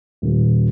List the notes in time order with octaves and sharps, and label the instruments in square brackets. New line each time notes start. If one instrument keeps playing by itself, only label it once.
[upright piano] D#1